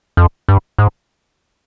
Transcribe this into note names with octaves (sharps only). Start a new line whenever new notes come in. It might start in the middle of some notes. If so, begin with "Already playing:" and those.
F2
G2
G#2